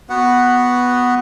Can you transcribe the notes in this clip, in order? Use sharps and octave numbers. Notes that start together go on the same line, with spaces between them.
B3 F#4 B4 F#5